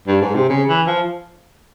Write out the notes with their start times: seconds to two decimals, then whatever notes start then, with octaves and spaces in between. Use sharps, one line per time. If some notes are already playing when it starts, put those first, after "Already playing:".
0.07 G2
0.21 G#2
0.35 C3
0.49 C#3
0.69 E3
0.87 F3